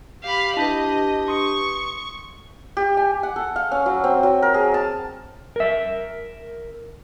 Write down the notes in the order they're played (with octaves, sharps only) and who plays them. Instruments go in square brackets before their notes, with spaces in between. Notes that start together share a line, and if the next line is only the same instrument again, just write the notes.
[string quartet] G4 F5 B5
[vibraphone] D4 G4 B4 [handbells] E4 A5 [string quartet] D#5
[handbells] C6 D#6 C#7 [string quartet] C#6
[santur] G4
G#5
F#5
A4
F5
C#4
F#3
C4
F#3
A#4
G#4
A5
[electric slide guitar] A#4 E5